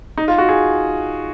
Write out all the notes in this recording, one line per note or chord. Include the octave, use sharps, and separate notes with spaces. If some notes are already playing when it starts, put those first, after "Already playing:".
D#4
F4
F#4
G#4